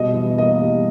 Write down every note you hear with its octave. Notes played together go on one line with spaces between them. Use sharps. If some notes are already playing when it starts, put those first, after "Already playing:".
Already playing: B2 G3 D#5
E3
A#3 D#5
G3